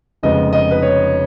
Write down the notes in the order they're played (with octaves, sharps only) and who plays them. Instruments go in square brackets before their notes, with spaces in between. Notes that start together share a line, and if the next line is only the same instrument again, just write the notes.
[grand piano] F1 F2 C#3 G#3 B3 D#5
D#5
B4
C#5